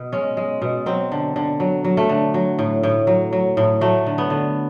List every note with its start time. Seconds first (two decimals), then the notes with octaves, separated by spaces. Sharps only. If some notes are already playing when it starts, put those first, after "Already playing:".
Already playing: B2
0.12 G#3 C#4
0.37 G#3
0.62 B2
0.86 F#3 C4
1.12 D3
1.36 D3
1.60 F#3
1.85 F#3
1.97 A3
2.09 D3
2.34 F#3
2.59 A2
2.83 A2
3.07 F#3
3.33 F#3
3.57 A2
3.81 F#3 A3
4.06 D3
4.18 B3
4.30 D3